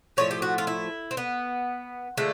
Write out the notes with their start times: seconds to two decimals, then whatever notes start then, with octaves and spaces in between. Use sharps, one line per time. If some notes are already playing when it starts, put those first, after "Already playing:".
0.17 A2 F3 A3 C#5
0.31 G4
0.42 F#4
0.58 F4
0.67 E4
1.11 C4
1.17 B3
2.17 D3 F3 G#3 A3